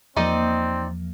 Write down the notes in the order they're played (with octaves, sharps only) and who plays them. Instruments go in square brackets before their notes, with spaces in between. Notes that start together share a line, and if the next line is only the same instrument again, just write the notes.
[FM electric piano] E2 F3 A#3 [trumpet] C4 [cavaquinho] D#4 D5 D#5